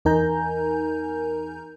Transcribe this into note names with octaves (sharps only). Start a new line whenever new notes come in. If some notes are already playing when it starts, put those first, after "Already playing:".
E2 D#4 A#4 G#5 A#5 G6